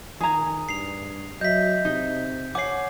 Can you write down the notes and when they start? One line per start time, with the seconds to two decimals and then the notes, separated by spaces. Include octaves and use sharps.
0.21 D#3 G#4 A#5 D#6 G#6
0.69 G2 C7 F7
1.41 F#3 D#5 E5 G6 B6
1.85 C3 D#4
2.55 C#5 F#5 G#5 D6 C7